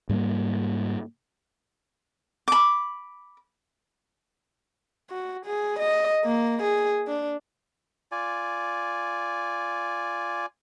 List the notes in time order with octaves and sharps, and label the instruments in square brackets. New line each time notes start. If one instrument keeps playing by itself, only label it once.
[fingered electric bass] G#2 G3 A3 A#3
[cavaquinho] B5 D6
[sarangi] F#4
G#4
D#5
A#3
G#4
D4
[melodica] F4 D5 G#5